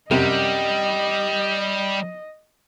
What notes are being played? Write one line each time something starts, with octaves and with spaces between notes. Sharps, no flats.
F#2 C3 G3 D#5